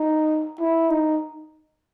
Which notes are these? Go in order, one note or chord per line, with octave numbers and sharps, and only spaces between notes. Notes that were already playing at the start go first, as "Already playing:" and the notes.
Already playing: D#4
E4
D#4